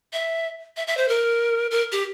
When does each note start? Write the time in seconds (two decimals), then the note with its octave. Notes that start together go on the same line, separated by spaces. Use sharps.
0.13 E5
0.77 E5
0.87 E5
0.97 C5
1.08 A#4
1.71 A#4
1.92 G4